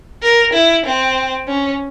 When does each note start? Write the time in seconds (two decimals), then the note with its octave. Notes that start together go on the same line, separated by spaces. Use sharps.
0.22 A#4
0.53 E4
0.86 C4
1.48 C#4